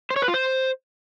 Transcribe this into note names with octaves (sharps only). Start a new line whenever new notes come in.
C5
C#5
B4
F4
C5